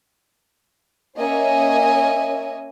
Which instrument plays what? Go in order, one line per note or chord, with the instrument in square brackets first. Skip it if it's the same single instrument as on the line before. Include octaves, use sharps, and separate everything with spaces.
[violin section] A#3 C#4 C#5 D#5 E5 G#5